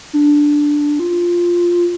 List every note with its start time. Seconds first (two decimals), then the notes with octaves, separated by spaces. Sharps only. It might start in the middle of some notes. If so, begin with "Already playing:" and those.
0.13 D4
0.99 F4